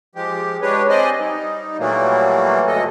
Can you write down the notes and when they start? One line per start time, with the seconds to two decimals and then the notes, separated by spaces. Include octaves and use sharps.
0.15 F3 G#3 G4
0.62 G#3 D4 G4 B4 C#5
0.89 C4 C5 D5 D#5 G#5
1.20 G3 D#4
1.79 A#2 E3 F#3 G3 A3 A#3
2.67 D2 G2 A4 D#5